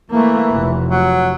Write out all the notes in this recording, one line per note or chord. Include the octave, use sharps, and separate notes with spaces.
E3 A3 A#3
F1
F#3